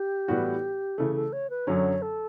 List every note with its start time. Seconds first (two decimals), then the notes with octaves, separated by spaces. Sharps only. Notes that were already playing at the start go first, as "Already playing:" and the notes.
Already playing: G4
0.28 A2 E3 G3 B3 F#4
0.98 C#3 E3 A3 A4
1.16 A4
1.33 C#5
1.50 B4
1.67 F#2 D3 F#3 C#4 C#5
2.02 A4